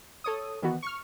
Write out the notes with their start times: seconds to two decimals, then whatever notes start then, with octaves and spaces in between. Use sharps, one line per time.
0.24 A4 C#5 D#6
0.62 D#3 E3 B3 F#4
0.82 C#6 F6